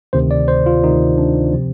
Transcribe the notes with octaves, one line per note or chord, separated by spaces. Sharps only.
D2 C3 D#3 C5
D5
C5
F4
D2 C3 D#3 D#4
D4
C3 F3 C4